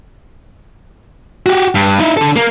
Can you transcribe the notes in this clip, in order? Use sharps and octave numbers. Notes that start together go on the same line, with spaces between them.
F#4 G4
G2
D#4 E4
D3 A4
A#3